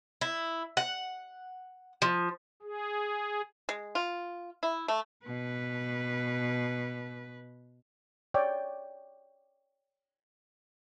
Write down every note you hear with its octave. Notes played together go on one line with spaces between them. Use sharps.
E4
F#5
F3
G#4
G#3
F4
E4
A3
B2 B4
C#5 D5 G5